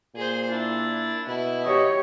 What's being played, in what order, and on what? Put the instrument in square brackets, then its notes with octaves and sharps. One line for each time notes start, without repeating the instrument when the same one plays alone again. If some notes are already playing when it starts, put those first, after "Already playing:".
[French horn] A#2 [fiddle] G#4 C5
[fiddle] D4 [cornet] E4
[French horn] B2 [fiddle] E4
[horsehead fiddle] G4 C#5 [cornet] D#5